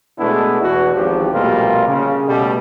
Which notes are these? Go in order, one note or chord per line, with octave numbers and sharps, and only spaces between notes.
B2 G#3 A3 B3 D4 E4
E2 B2 E3 F#4
G#1 E2 G#2 F3 G4
A#1 B2 G3 A3 A#3 F4
C#3
B2 G3 A3